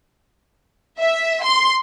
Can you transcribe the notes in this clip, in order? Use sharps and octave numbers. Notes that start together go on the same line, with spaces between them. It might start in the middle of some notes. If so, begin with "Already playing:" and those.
E5
C6